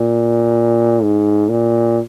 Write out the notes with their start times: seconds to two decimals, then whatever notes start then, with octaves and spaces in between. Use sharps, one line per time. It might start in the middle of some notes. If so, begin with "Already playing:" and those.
Already playing: A#2
1.03 G#2
1.50 A#2